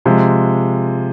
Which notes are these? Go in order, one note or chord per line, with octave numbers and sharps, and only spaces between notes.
C3 F3 G#3